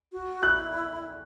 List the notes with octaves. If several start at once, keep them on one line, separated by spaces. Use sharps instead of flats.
F#4
E4 F#6